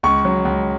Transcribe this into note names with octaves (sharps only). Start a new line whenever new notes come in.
C#2 C#6
F#3
C#2